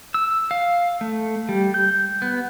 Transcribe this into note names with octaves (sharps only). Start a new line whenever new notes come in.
E6
F5
A3
G3
G6
B3